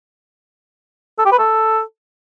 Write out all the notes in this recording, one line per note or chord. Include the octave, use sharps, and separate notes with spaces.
A4
G4
B4
A4